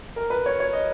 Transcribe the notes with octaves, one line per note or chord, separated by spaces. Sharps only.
A#4
B4
C#5
C#5
D#5